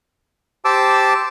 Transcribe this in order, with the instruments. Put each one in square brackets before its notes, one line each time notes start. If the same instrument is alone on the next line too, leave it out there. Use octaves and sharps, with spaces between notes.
[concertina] G4 C5 A5 D6 E6